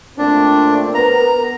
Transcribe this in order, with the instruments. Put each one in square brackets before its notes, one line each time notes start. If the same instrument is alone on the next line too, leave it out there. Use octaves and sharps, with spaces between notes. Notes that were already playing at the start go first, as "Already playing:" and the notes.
[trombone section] A#2 A3 C4 [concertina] D4
[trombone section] B3 A#4 [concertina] A#5